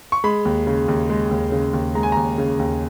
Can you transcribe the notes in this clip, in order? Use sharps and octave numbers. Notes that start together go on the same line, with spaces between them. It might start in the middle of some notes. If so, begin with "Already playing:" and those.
C#6
G#3 B5
D#2
C#3
D#2
G#3
D#2
C#3
D#2
G#3 A#5
G#5
D#2 A#5
C#3
D#2